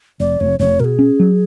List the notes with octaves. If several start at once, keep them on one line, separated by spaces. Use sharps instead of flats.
F1 D5
F1 C#5
F1 C#5
B2 G#4 A#4
C#4
F#3